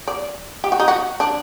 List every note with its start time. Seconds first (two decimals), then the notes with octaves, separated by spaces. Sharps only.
0.08 D5
0.64 G4
0.72 F#4
0.80 D#4
0.88 F#4
1.20 D4